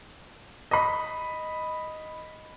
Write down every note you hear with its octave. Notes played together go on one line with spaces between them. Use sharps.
D#5 B5